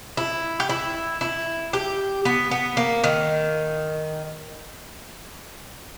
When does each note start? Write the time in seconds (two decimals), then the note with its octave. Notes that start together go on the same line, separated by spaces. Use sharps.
0.17 E4
0.60 G4
0.69 E4
1.21 E4
1.73 G4
2.25 B3
2.51 B3
2.77 A#3
3.04 D#3